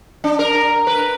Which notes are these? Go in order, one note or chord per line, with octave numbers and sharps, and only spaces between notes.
D4
A#4
B4